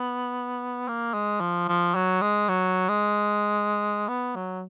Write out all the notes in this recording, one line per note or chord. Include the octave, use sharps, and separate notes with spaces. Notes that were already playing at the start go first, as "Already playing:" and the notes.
Already playing: B3
A#3
G#3
F3
F3
F#3
G#3
F#3
G#3
B3
F#3